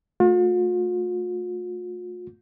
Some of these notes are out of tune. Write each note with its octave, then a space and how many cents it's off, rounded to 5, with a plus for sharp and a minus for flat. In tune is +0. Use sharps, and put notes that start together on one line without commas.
A3 +0 F4 +45